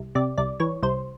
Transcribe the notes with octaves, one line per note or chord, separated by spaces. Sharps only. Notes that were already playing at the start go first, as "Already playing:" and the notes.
Already playing: C2
C3 D5
C2 D5
E3 C#5
C2 C5